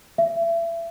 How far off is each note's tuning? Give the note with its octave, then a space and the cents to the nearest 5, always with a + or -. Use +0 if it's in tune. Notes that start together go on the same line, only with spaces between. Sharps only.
E5 +30